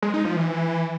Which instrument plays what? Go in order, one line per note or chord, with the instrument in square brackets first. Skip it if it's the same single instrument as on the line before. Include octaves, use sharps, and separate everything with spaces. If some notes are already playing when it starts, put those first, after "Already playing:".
[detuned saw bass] G#3
D#4
F3
E3